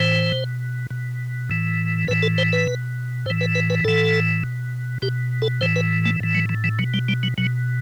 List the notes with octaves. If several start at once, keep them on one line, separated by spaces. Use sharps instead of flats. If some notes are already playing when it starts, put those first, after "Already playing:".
Already playing: A2 E3 C5
B2
B2
A2 E3
A2 E3 B4
A4
C5
B4
B2
A2 E3 C5
B4
B4
B4
A2 E3 A4
B2
B2 G4
A4
A2 E3 C5
B4
A3
A2 E3
F#3
E3
E3
B2 F#3
G3
G3
F#3
B2 F#3